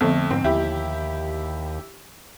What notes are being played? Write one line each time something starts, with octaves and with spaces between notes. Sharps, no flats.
F2 D3 F3 A3 B3
G#2 C4
D#2 E4 G4